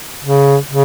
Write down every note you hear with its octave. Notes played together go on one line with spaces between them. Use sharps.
C#3
C#3